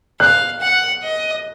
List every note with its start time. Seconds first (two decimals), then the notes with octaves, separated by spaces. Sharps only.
0.20 F5 F#6
0.61 F#5
1.03 D#5